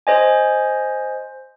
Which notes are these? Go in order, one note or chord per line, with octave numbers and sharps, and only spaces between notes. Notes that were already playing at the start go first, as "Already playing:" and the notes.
C5 D#5 G#5